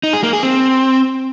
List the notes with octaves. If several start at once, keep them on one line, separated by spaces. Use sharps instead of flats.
D#4
G#4
A#3
G#4
C4